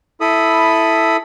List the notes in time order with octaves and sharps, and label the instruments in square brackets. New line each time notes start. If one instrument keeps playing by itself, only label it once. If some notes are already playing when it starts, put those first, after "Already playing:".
[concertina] E4 A4 B5 D#6